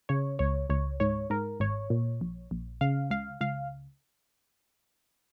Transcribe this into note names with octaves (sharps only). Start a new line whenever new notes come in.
C#3 C#5
C#2 C#5
C#2 C#5
G#2 C#5
G#2 A#4
G#1 C#5
A#2
A#1
A#1
C#3 F5
C#2 F5
C#2 F5